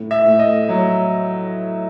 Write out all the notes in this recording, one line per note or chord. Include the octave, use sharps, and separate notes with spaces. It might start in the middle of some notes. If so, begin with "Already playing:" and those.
Already playing: A2
E5
A2
D#5
F#3